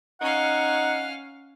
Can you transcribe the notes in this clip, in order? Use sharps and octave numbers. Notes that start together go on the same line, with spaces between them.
C#4 D#4 F5 F#5